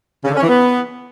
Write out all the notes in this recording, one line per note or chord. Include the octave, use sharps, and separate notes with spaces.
C#3
D3
C#4
E3
B3